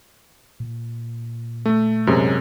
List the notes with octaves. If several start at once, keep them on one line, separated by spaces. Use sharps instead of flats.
A#2
A3
F#2 C3 G#3